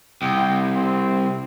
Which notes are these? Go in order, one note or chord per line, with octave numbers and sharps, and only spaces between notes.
C2 G5
C4